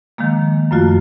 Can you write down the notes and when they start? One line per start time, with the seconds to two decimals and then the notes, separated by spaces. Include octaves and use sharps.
0.18 D#3 F3 G#3 A#3
0.71 F#2 F3 A3 F4 F#4